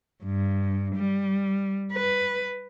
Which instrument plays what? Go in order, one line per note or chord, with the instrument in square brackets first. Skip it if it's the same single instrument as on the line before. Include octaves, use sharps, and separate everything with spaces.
[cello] G2
G3
B4